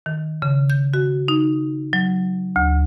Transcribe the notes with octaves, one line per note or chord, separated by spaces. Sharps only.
D#3
C#3
G6
F#4
D#4
F#3
D2